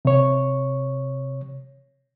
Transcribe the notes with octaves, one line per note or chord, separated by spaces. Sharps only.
C3 C#5